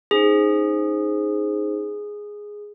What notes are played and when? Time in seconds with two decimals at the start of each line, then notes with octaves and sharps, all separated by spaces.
0.11 C#4 D#4 G#4 C5